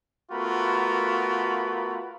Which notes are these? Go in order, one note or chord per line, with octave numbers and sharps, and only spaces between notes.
A3 B3 F4 F#4 A#4 B5